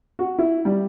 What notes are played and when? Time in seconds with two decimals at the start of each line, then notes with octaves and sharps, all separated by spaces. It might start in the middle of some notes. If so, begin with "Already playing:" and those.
0.19 F#4
0.39 E4
0.65 G3